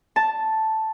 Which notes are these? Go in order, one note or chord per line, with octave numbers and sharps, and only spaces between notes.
A5